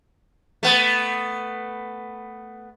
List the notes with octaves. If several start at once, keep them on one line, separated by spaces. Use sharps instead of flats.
A3 B3